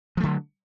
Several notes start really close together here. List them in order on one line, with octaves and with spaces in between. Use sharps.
F3 A3 D3 F#3